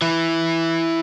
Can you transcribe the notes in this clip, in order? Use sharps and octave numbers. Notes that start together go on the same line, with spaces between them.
E3 E4